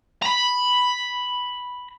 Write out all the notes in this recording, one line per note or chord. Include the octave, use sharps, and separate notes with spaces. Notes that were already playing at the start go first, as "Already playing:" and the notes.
A#5 B5